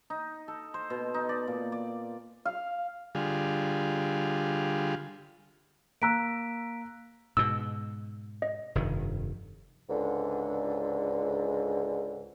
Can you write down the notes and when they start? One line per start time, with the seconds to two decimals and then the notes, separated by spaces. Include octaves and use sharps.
0.10 D#4
0.48 A4
0.74 C5
0.90 B2
1.14 D#4
1.29 D5
1.47 A#2
1.72 D5
2.45 F5
3.15 D3 G3 F4 G#4
6.02 A#3 A#5 E6 F#6 B6 D7
7.37 G#2 B2 E6
8.42 D#5
8.75 F1 G2 D#3
9.90 C#2 G#2 D3